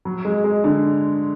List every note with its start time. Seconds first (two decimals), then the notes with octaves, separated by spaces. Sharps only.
0.05 F#3
0.25 G#3
0.44 G#3
0.64 D3